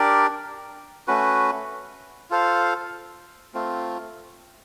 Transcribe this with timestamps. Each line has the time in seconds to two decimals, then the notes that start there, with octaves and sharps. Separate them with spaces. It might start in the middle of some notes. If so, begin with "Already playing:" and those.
Already playing: D4 G4 A#4 D5
1.08 A3 C#4 F#4 B4
2.30 F4 A4 C5 F5
3.54 A3 C4 F4